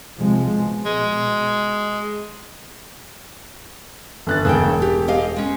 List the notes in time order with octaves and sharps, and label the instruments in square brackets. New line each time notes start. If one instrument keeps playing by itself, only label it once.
[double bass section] C3 F3 G#3
B2
[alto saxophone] G#3
[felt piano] G1 F#6 A6
[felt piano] E1 [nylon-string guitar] C#3 A3 G5
[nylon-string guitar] G4
G4 D#5 F5
G#3 C#4